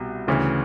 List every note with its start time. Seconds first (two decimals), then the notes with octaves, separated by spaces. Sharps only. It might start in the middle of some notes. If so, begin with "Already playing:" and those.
Already playing: C2 B2
0.28 D2 C#3 E3